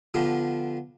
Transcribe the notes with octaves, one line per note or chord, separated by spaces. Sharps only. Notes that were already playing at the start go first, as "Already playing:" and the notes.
D3 F3 B3 D4 F4 G4